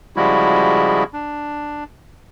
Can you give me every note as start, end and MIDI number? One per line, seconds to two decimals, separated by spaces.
0.17 1.04 49
0.17 1.04 53
0.17 1.04 55
0.17 1.04 56
0.17 1.04 64
0.17 1.04 66
1.13 1.84 62